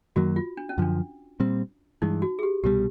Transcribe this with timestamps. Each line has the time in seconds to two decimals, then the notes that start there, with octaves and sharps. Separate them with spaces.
0.16 F#2 D#3 F#3 A#3 F#4
0.36 F4
0.57 D4
0.69 C#4
0.78 F#2 D3 F3 D4
1.40 A#2 G3 C4
2.02 G2 E3 G#3 D#4
2.22 F#4
2.39 G#4
2.43 G4
2.64 C2 B2 G3 G4